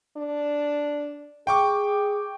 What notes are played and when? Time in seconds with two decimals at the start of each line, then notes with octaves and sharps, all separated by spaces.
0.17 D4
1.47 G#4 G5 C#6 D6